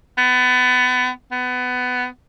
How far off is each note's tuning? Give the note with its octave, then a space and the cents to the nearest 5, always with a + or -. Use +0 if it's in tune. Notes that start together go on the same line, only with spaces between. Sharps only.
B3 +25
B3 +20